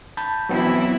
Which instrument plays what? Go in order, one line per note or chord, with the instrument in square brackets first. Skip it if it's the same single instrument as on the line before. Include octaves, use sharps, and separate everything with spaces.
[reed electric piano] A5 B5 G6
[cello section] E3 E4 [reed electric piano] F#3 B3 C4